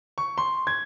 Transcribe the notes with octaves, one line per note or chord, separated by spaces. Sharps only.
C#6
C6
G#6